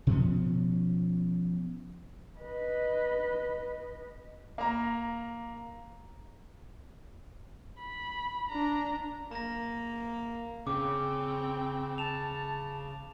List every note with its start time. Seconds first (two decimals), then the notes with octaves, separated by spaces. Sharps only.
0.07 B2 F3 C#4
2.40 B4 D#5
4.58 A#3 A#5
7.80 B5
8.49 D4 A#5
9.31 A#3 A#5 A#6
10.67 C#3 C4 G5 D6
11.98 A5 E7 F7